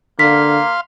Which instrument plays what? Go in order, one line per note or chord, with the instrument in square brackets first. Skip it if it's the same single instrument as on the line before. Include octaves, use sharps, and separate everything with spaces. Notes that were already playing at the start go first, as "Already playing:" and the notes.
[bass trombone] D3 [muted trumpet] A#3 [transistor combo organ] F5 C6 [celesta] B6